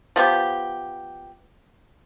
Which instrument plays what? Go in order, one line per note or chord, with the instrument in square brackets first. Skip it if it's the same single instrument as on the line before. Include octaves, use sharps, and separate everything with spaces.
[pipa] F3 B3 G4